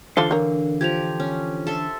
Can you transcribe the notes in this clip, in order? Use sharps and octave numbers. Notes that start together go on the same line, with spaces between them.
D3 E3 F4 A4 C5 F5 G7
D4 A#4 C#5 A#5
F3 G4 G#6 F7
C#4
A4 E5 C6